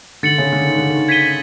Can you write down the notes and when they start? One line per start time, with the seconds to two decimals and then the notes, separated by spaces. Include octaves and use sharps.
0.23 D3 A6 C#7 F#7
0.38 C#3
0.52 D3
0.66 D#3
0.78 D3
0.90 D#3
1.08 G#6 B6 D#7 G7